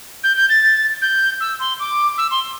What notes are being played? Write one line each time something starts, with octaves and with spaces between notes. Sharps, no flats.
G6
G6
A6
G6
E6
C6
D6
E6
C6